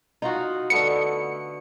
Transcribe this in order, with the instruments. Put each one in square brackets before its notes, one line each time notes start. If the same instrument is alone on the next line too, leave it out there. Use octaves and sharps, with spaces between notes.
[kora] D#4 F4 F#4
[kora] D3 A3 B3 [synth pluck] C#7